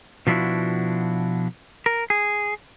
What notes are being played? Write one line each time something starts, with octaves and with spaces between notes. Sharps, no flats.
B2 F3 D4 E4 F#4
A#4
G#4